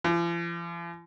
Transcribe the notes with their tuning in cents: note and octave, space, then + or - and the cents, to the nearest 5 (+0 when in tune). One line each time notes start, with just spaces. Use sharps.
F3 -45